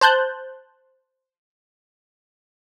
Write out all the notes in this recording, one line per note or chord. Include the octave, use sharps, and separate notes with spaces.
C5 A5 F#6 G6